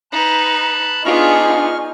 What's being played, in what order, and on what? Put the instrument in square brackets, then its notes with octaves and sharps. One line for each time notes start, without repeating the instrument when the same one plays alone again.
[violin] D#4 B4 [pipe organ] A5 B5 F#6
[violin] B3 G#4 [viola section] D4 F4 [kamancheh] D#4 G#5 [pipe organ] C#6 F6